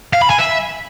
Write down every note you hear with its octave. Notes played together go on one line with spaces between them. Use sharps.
F5
B5
G#5
E5